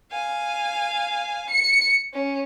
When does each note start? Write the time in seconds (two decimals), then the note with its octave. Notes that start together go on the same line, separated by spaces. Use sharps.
0.12 F5 G#5
1.50 C#7
2.14 C#4